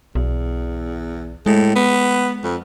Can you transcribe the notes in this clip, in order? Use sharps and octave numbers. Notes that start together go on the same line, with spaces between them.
B1 E2
A2 G#3
B3
F2